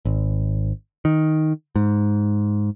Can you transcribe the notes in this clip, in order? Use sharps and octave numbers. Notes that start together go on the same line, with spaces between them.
G#1
D#3
G#2